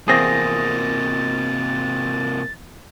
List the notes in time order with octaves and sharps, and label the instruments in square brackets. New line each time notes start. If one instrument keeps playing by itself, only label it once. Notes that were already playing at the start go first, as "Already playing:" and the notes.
[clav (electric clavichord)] E2 C4 G#4 [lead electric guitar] C3 A#3 [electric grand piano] D#6 A#6 [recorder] A6